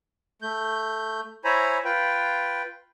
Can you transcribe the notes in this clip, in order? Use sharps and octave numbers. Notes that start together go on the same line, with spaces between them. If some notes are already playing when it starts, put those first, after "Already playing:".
A3 G6
E4 C5 C#5 G#5 A#5 B5
F4 B4 G5